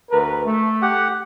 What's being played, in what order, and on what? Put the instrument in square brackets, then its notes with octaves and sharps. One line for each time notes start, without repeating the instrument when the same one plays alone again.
[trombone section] D2 A#4 B4
A3
[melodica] G4 F#5